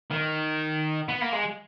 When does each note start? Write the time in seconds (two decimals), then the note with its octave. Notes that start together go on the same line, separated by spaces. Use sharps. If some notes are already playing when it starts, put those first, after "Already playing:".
0.11 D#3
1.09 B3
1.22 A#3
1.33 G#3